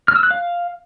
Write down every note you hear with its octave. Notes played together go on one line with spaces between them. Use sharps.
F6
E6
F#6
F5